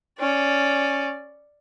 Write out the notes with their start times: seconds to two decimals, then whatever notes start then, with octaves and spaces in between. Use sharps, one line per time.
0.19 C#4 D5